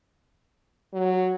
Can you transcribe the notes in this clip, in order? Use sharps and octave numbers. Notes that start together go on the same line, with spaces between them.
F#3